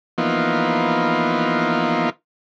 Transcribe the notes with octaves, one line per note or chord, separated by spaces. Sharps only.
E3 F3 A#3 B3 D#4 F4